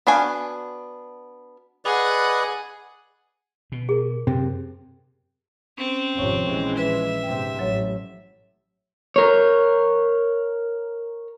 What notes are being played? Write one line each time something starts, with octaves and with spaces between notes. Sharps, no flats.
B3 D4 F#4 F5 G#5
G#4 B4 D5 D#5 F#5
B2
G#4 A#4
F#2 C3
C4 C#4
G#1 F2 C3 C#5 C#6
A#1 E3 G#3 C#4
B4 E5
G#2 C3 G5
A1 F#3 C#5
A#4 C#5